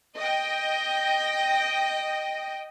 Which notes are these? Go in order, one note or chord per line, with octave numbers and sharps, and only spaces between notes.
D#5 G5